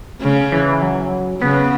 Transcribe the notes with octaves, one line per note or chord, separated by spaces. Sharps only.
C#3
E3
F#3
C#3 B3